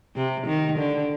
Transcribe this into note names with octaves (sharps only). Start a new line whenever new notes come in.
C3
D#3
D3